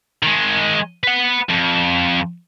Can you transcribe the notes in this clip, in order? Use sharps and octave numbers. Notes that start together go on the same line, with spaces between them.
D#3 G#3
B4 F#5
F2